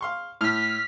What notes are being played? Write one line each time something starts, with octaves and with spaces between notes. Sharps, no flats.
F5 C6 C#6
A2 F6 B6